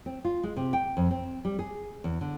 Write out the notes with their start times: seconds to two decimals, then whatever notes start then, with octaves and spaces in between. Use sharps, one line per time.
0.06 C4
0.25 F4
0.43 G#3
0.56 C3
0.73 G5
0.97 F2
1.11 C4
1.45 G3
1.59 G#4
2.04 E2
2.21 D3